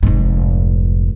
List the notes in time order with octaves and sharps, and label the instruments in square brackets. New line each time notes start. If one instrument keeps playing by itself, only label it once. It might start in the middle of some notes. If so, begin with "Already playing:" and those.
[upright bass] F1 G#2